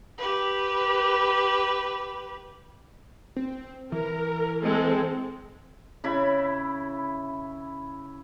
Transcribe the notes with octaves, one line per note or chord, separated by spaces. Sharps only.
G4 B4
C4
E3 A#4
G#3 C4 A4
C#3 E4 B5